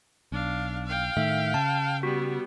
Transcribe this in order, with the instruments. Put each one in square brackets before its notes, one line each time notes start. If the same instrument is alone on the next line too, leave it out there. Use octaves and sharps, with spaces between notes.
[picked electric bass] B1 [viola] D4 F5
[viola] F5 G5
[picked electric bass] A2 D#3 A3 [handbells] E5
[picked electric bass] C#3 [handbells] A5
[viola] G3 B3 [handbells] F#4